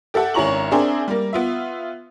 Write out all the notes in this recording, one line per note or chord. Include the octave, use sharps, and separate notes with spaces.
G4 A4 E5 F#5
G#1 C#4 E4 A#5 C#6 F#7
C4 D4 G#4 A#4 E5
G3 A#3
B3 F4 E5